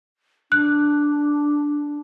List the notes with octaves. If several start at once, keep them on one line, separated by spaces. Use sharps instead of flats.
D4 F#6